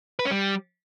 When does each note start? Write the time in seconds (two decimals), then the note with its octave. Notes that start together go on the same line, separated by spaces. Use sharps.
0.19 B4
0.25 C#4
0.31 G3